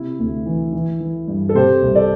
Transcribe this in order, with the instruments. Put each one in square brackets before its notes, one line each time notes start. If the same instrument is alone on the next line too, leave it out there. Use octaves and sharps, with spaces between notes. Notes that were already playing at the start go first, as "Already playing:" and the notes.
Already playing: [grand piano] C3 E4
D2
E3
E3
E3
G2
A4
C3 G4 C5
C2
A4 D5